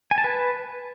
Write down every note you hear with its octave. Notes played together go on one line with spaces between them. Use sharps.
G#5
A5
B4